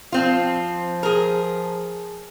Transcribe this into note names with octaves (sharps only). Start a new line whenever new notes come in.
F3 C4 F4
G#4 A#4